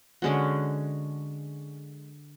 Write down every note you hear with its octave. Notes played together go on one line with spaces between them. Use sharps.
D3 G#3 C#4 F#4